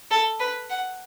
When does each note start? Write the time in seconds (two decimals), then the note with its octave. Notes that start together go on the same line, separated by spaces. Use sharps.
0.11 A4
0.40 B4
0.70 F#5